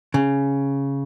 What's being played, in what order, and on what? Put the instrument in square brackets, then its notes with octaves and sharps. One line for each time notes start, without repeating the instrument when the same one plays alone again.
[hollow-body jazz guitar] C#3